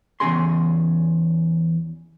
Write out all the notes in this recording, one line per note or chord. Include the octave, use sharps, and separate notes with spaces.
E2 A#2 C#3 G#4 C6